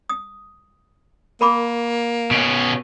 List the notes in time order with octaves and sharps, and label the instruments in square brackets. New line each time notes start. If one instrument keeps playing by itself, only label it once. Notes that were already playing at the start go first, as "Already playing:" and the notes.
[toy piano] D#6
[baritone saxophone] A#3 [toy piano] A#4 B5 D6
[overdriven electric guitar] B2 C#4